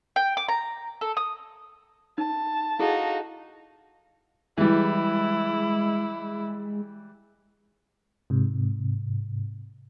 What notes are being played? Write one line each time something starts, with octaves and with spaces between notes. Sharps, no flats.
G5
D6
A#5
A4
D#6
D#4 A5
D#4 E4 F#4 G#4 A4 F5
E3 G3 G#3 E4
G#2 C3